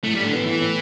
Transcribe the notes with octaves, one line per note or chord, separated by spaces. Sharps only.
A2 A3
A2 G3
D3
E3 B3
A2 E3
A2